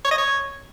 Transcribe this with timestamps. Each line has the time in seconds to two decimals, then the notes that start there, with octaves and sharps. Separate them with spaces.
0.05 C#5
0.11 D#5
0.18 C#5